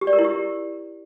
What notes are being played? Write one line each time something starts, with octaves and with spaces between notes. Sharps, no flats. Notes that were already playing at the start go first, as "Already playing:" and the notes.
G4
D5
A#4
E4
G4